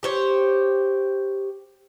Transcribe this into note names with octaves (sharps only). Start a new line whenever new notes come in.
G4 C5 C#5